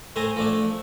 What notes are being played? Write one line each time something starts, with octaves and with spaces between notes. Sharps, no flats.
A2 A3 C5 G#5 A#5
F3 A3 D4